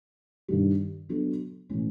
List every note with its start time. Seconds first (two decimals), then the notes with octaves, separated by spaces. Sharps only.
0.48 G2 D#3 G3
1.09 F#3 B3 D4 F#4 A4
1.70 A2 E3 G#3 C#4